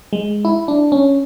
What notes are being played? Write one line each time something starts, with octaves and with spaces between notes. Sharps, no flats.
G#3
E4
D4
C#4